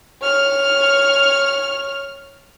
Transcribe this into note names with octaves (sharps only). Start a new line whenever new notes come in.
C#5 F6